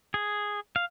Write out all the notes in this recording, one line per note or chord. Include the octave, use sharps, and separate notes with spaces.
G#4
F5